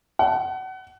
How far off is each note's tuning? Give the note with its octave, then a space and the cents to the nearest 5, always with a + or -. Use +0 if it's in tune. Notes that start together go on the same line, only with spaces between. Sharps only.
F#5 +30